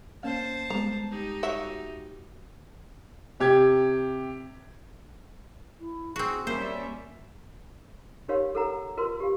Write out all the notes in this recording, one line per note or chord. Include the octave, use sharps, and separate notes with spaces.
A#3 C#4 C5 F5 A5
G3 G#3 B3 A#5
D#4 G4
F#3 F#4 E5
C3 G4 G#6
E4
C4 F#4 G#4
G3 A#3 C#4 A#4 C5 E5
D#4 G4 A#4 C#5 F5 C6
A4 A#4 F#5 A#5
F4 F#4 A#4 B4 C6
G4 F5